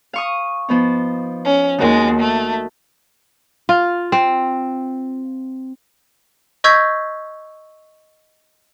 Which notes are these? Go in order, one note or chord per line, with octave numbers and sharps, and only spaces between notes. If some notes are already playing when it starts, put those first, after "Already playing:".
F5 C#6 D#6
F3 B3 D#4
C#4
D#2 G#3 D#4 F#4 A#4
A3
F4
C4
D#5 C#6 E6 G6 G#6 B6